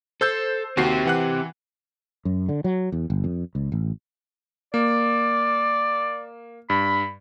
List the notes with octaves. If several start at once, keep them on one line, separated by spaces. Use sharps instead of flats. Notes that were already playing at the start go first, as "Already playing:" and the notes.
A4 C5 E6 G6
D#2 C4 F#4 G4 C7
E3 F#5 F#6
F#2
D3
F#3
E2
G1
F2
C#2
A1
A#3 D5
G2 B5